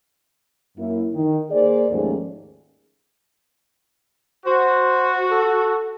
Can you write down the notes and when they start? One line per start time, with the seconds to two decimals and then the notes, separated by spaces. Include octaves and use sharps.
0.77 F#2 A#3 E4
1.13 D#3
1.51 A#3 G#4 C5 D5
1.90 D#2 G#2 F3 A3 C#4 G#4
4.46 F#4 C5
5.31 A4